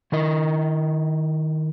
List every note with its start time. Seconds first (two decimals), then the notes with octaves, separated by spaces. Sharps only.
0.12 D#3 E4 A#4 D#5